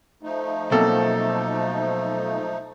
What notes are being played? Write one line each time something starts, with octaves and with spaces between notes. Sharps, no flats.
F3 A3 D#4
B2 F#3 A#3 C4 A4